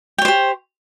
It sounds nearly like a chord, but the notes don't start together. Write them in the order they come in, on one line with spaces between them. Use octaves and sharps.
G5 C#5 C5 G4